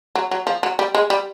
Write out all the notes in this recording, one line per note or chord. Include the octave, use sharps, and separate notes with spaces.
F#3
F#3
F3
F#3
G3
G#3
G3